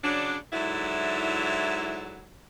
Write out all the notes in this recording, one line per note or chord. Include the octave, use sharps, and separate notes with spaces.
C#3 F#3 D4
G#2 D3 F#3 E4